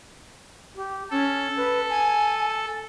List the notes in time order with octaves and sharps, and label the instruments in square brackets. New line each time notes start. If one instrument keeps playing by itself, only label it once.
[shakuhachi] G4
[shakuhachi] C#4 [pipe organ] A4
[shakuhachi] B4
G#5